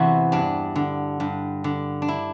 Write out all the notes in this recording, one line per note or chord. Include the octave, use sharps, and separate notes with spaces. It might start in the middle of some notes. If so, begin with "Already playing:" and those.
Already playing: E2 C3 E3 E4 F#4
G2 D4
D3
G2
D3
D4
E4